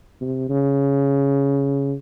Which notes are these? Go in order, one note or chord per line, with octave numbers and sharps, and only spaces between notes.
C3
C#3